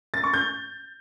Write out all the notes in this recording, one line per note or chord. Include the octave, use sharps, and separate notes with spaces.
A6
C#6
G6